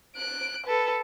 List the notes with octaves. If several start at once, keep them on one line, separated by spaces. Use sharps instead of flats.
F#6 D7
A4 B4